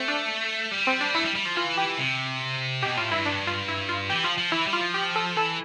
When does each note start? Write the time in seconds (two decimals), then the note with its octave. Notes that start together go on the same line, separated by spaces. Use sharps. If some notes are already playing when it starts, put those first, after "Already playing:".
Already playing: A3 C4
0.08 D4
0.72 G3
0.87 C4
1.01 D4
1.14 A3 E4
1.25 G3
1.36 G3
1.46 F3
1.56 E3 F4
1.77 G4
1.99 C3
2.83 B2 G4
2.97 A2 F4
3.11 G2 E4
3.26 D4
3.47 F4
3.68 E4
3.89 F4
4.10 E3 G4
4.24 F3 F4
4.38 F3
4.52 E3 E4
4.67 G3
4.73 F4
4.81 F3
4.94 G4
5.16 A4
5.37 E3 A4